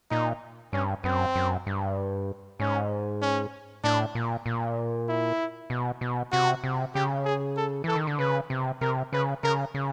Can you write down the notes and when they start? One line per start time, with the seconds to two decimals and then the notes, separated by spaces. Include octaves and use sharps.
0.11 A#2 D#4
0.73 G2 C#4
1.04 F#2 C4
1.35 F#2
1.67 G2
2.60 G#2 C#4
3.22 C#4
3.84 A2 D4
4.15 A#2
4.46 A#2
5.08 E4
5.70 B2
6.01 B2
6.32 C3 F#4
6.64 C3
6.95 C#3 G4
7.25 G#4
7.57 A4
7.84 E3 A4
7.96 D#3
8.07 D3
8.19 C#3 B4
8.50 C3
8.81 C3 A#4
9.13 C#3 B4
9.43 C#3 A#4
9.74 C#3